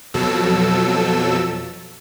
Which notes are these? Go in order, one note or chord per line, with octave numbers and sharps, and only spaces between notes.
F2 B2 F3 F#3 A4 E6